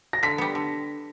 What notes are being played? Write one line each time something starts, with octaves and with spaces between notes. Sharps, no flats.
A#6
D3 B6
G3 B3
D3